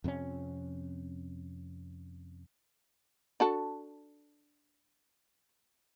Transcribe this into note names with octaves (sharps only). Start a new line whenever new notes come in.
F2 C3 A#3 C#4
D4 F#4 A4